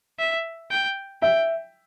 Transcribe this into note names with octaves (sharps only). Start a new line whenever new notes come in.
E5
G5
E5 G5